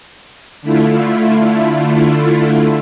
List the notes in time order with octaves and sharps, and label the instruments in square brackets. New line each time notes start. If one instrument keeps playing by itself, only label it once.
[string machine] D3 A3 E4 F4